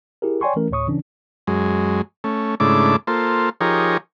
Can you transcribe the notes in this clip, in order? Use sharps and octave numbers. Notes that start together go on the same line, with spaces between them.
E4 G4 G#4 A#4
C#5 D5 G5 G#5 C6 C#6
E3 A3 C#4 A#4
D2 A2 C#5 C#6 D#6
C#3 E3 C#4 D4
F#2 G#3
A3 C#4
G#2 C#3 A3 D4 E4 D6
A#3 F4 A4 C5
F3 D#4 G4 G#4 A#4 C#5